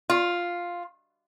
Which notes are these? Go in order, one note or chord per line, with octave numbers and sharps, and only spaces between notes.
F4